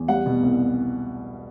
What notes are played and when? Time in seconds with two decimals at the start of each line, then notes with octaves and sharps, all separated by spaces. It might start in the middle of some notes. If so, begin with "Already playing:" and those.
Already playing: E2
0.08 G3 F#5
0.26 B2
0.43 C2